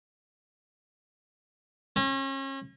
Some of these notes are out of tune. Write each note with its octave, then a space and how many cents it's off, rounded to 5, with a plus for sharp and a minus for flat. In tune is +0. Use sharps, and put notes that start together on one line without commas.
C#4 -35